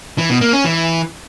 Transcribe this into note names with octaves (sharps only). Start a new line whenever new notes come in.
E3
B2
A#3
C#4
E3